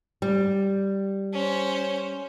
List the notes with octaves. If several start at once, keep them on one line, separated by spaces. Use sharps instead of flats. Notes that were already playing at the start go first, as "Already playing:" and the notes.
G3
C#4 C5